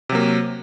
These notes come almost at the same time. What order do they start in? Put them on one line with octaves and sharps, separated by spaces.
C3 F#3 A#3